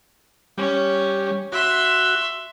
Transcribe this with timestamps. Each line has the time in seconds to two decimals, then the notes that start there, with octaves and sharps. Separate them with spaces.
0.58 G3 C#4
1.52 F#4 E5 C6